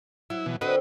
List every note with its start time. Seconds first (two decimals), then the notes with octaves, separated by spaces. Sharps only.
0.30 F#3 E4
0.46 B2 E3
0.61 D3 C4 F#4 B4 D#5